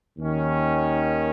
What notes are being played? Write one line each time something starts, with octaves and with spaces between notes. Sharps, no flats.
D#2 D#3 C#4